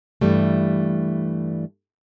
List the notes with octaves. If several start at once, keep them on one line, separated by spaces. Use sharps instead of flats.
G2 E3 G3 A3